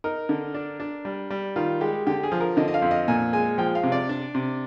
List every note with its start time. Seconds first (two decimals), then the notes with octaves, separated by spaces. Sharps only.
0.04 D#4 A#4
0.29 D3
0.54 D4
0.80 D4
1.05 G3
1.30 G3
1.56 D#3 F4
1.81 G#3 G4
2.07 D3 G4
2.23 G#4
2.32 F3
2.40 A#4
2.57 D3 D#5
2.68 D#5
2.74 F5
2.82 F2
2.91 D#5
3.08 A#2 G#5
3.33 G#3 G#5
3.58 F3 G5
3.75 F5
3.83 C3
3.92 D5
4.09 D4
4.35 C3